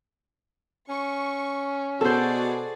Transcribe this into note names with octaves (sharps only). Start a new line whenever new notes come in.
C#4 C#6
B2 F#4 G#4 A4 C5 D5